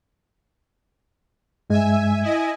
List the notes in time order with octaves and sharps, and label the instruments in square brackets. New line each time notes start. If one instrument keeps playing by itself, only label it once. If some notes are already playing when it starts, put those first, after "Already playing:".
[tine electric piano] G2 G#3 [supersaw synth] E5 G#5
[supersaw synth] E4 D#5 G#5